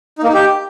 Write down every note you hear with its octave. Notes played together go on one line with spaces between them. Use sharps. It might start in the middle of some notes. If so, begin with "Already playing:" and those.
D#4
A#3
D#4
G4